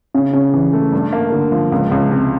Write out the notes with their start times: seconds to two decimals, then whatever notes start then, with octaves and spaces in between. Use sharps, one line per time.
0.15 C#3
0.33 C#3
0.54 E3
0.73 A3
0.92 G2
1.13 A#3
1.32 D3
1.52 F3
1.72 C#2
1.91 C#2
2.11 C3